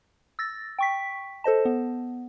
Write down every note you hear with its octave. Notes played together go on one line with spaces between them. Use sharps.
E6 A6 A#6
G5 C#6 B6
A4 C5 D#5 A5
B3